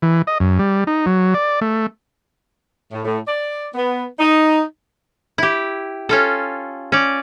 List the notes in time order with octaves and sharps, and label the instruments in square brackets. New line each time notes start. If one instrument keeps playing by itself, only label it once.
[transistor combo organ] E3
D#5
F#2
G3
D#4
F#3
D5
A3
[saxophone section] A2
A2
D5
B3
D#4
[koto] E4 G4
C#4 F4 A4
C#4 D5